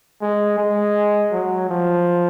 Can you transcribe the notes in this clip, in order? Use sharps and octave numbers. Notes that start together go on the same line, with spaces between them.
G#3
G#3
F#3
F3